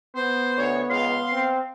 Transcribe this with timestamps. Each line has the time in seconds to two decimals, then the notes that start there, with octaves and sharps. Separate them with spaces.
0.15 B3 C5
0.57 D2 C#5
0.90 C#2 F5 C6
1.33 C4